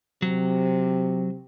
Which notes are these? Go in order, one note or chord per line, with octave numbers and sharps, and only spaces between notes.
C3 F#3